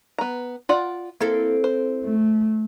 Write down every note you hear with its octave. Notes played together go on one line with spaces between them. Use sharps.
B3 A#5
F4 D5 F#5
A#3 C4 E4 A4
C5
A3